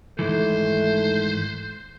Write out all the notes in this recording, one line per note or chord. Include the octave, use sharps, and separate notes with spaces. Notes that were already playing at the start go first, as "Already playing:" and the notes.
G#2 D#3 E3 A3 C5